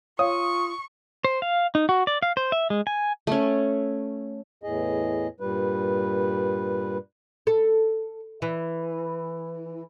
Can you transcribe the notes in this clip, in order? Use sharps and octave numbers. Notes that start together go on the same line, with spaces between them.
F4 C#5 F5 C#6 D#6
C5
F5
D#4
F#4
D5
F5
C5
E5
G#3
G#5
A3 C#4
E2 A2 G#4 D#5
G2 A#2 G3 B4
A4
E3